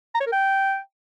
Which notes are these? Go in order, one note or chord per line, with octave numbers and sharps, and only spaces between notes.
A#5
C#5
A#4
G5